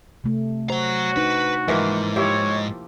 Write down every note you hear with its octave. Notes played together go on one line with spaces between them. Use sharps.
C3 A3
F#3 F#4 C5 A#5
D4 D#4 B4
G#2 E3 F3 A#3
F3 E4 G4 C#5